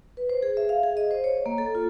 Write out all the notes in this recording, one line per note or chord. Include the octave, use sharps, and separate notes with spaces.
B4
C5
G#4
E5
F5
G#4
D#5
C5
C#5
A#3
A4
F4